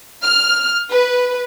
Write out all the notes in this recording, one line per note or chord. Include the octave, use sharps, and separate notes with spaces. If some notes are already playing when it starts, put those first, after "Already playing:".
F6
B4